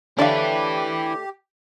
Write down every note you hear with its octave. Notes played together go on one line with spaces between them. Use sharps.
D3 A3 D4 E4 G4 B4 C#5 F5